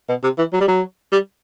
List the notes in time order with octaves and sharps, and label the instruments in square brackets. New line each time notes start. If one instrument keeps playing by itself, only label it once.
[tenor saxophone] B2
C3
E3
F#3
G3
F#3
G3